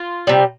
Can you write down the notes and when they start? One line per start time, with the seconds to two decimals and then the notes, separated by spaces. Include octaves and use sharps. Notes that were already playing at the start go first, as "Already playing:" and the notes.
Already playing: F4
0.27 C3 G3